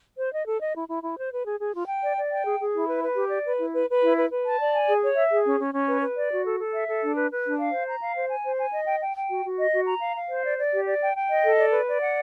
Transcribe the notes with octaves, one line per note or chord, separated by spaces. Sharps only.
C5
D#5
A4
D#5
E4
E4
E4
C5
B4
G#4
G#4
F4
G5
D5
D5
G5
G#4
G#4
E4
B4
B4
G4
D5
B4
E4
B4
B4
E4
B4
B4
A5
D5
G#5
G#4
C#5
E5
G#4
C#4
C#4
C#4
B4
B4
D5
F#4
A4
A4
E5
A4
D4
B4
B4
D4
F5
C5
A#5
F5
C5
G#5
C5
G#5
D#5
G5
G5
G5
F#4
F#4
D#5
F#4
A#5
F5
F5
C5
D5
D5
G4
D5
G5
G5
D#5
A4
D5
B4
D5
F#5